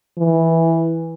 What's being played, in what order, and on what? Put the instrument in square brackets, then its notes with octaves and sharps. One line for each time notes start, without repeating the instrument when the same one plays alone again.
[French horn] E3